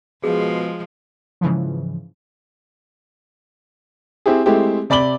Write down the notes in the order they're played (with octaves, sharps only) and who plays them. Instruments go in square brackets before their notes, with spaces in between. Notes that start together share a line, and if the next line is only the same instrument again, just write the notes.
[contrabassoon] B2 [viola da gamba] F3 G#3 [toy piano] G#4
[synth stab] G#2 C#3 E3 F3
[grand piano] C4 E4 G4 G#4
G#3 A3 C4 E4 G4
C3 D5 B5 D6 F#7 G7